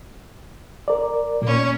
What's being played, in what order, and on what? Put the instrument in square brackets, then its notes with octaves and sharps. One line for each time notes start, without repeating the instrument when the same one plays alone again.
[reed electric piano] A#4 D5
[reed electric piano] A#2 [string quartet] A#3 C#4